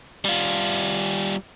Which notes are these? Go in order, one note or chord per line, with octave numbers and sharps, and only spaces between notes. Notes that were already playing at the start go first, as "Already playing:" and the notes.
G3 F4